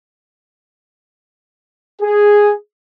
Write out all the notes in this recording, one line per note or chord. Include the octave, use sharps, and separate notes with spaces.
G#4